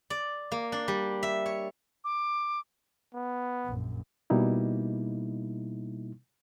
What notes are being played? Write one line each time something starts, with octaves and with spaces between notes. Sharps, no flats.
D5
A#3
D4
G3
E5
C#5
D6
B3
A#1 F#2
B2 G3 A#3 D#4 E4